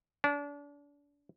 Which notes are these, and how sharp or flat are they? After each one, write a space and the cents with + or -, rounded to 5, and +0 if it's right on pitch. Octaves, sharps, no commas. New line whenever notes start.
D4 -35